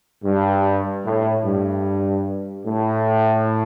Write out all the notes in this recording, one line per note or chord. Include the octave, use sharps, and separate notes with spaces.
G2
A2
G2
A2